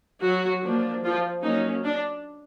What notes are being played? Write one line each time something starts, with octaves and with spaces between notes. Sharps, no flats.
F#3 F#4
F3 A#3 D4
F3 F4
F#3 A#3 C#4 D#4
D4